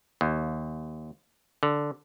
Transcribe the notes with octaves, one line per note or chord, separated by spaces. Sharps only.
D#2
D3